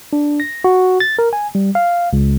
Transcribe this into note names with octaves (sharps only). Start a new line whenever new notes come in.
D4
A#6
F#4
A6
A#4
G#5
G3
F5
C#2